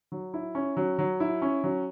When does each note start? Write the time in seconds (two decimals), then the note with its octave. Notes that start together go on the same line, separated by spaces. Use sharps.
0.12 F#3
0.34 E4
0.55 C#4
0.77 F#3
0.99 F#3
1.20 E4
1.42 C#4
1.64 F#3